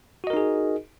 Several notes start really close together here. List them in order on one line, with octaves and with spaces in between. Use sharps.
F#4 D#5 A#4 D#4 G#4